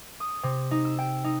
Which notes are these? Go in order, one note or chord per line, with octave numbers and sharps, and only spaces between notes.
D#6
C3
D#4
E6
G5
D#4